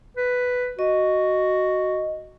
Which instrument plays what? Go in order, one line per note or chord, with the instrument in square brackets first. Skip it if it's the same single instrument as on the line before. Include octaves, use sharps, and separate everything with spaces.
[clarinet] B4
[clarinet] F#4 [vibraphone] D#5